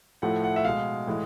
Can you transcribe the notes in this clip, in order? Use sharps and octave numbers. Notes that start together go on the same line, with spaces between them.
A2 F3 A3 F#5
F#5
E5
B2 G#3 F5
A2 E3 G#3